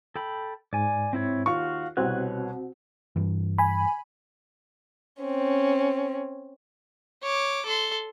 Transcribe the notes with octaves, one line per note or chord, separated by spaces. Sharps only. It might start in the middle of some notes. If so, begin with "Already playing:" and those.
A4 G5 B5
G#2 D5 G#5
C4 E4 C#5
D#2 F4 F#4 F5 C#6
C2 B2 C4 F#4 B4 C#5 F#6
G2 E3
G#5 B5
C4 C#4
C#5 D6
A4 C6